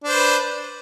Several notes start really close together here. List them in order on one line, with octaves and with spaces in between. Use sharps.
D4 C5 B4